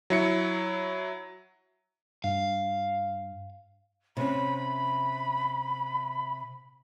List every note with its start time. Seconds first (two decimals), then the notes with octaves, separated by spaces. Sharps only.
0.10 F#3 E4 C#7
2.24 G2 F5
4.17 C3 C#4 B5